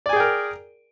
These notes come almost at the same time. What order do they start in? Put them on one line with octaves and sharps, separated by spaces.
D5 G#5 G#4 G5 A#4